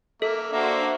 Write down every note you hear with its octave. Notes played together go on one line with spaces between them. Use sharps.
A#3 A4 E5
A#3 D4 F#4 C5 E5